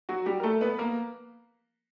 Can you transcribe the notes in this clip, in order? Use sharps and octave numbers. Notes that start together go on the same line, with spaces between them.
F#3 F#4
G3 G4
A#4
A3 A4
B3 B4
A#3 A#4